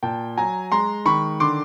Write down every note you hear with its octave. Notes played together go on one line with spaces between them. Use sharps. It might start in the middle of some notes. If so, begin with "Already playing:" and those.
A#2 G5 A5
F#3 G#5 A#5
G#3 A#5 C6
D#3 B5 C#6
D3 C6 D6